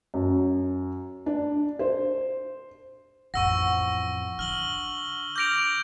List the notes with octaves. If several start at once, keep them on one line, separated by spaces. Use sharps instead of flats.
F#2
D4
C5
A1 F2 F#5 C#6 E6 A#6
D3 F6 F#7 G7
D6 F6 G6 A#6 D7 F7